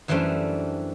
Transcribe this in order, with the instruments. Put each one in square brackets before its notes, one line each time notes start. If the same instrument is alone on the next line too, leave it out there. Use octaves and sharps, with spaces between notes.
[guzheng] F#2 E3 G3 A3 C4 D4